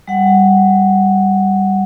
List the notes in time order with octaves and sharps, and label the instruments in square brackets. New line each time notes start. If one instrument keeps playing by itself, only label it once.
[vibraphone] G3 F#5